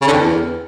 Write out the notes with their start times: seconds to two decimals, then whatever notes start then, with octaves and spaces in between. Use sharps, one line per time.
0.01 C#3
0.07 D3
0.13 F2
0.19 E2